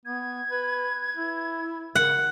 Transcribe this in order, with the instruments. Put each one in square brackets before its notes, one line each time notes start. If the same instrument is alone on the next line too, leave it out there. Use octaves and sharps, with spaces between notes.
[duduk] B3 [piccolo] G#6
[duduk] B4
E4
[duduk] C#3 [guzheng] F#5